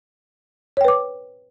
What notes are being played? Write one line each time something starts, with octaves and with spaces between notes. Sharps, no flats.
B4 C#5 G5 D6